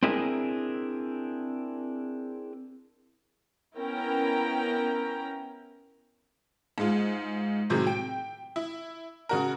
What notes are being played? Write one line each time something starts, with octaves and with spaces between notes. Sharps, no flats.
C4 D4 E4 G#4 A#4
B3 C#4 E4 A#4 G5 A#5
G#2 G#3 F4
A2 C3 D#3 F#3 G#3
G5 D7
E4
C#3 F#4 A#4